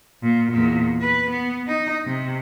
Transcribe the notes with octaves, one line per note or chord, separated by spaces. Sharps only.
A#2
E2 A#2
B4
B3
D#4
C3